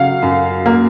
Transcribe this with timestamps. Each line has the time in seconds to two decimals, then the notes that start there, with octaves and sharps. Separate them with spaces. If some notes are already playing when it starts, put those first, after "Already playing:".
Already playing: C#3 F#3 F5 F#5
0.22 F#2
0.66 A#3